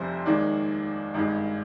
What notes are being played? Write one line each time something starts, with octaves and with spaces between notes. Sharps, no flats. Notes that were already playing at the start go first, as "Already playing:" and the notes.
Already playing: F1 F2 C3 G3 C5
D#2 D#3 G#3 D5
G#1 G2 D#3 G#3